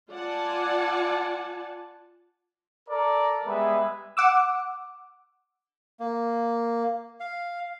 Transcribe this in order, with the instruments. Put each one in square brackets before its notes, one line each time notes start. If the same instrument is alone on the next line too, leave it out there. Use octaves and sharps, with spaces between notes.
[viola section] F4 D5 F#5 G#5 A5
[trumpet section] A4 A#4 D5 A#5
G3 G#3 B3 G#4 B4 E5
[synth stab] F#5 D6 E6
[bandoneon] A#3
F5